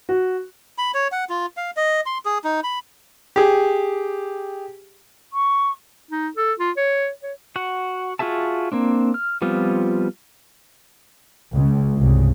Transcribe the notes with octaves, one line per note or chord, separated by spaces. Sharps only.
F#4
B5
C#5
F#5
F4
F5
D#5
C6
G#4
D#4
B5
G4 G#4
C#6
D#4
A4
F4
C#5
C#5
F#4 F#5
F4 F#4 G#4 E5 A5
A#3 C4 D4
F6
F3 G3 B3 C4 F4
C#2
C2 G2 C#3